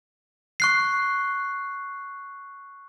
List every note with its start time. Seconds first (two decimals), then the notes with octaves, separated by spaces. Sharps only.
0.60 C#6 F#6 C7